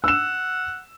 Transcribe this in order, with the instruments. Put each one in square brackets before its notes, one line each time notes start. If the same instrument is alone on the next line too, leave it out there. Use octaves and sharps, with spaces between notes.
[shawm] F#5 [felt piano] E6 E7